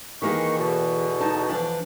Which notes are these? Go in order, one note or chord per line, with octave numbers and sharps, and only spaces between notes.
D#3 E3 A#3 G#4 C#6
E2 B2 D3
D#4 A5
E3 F3 D4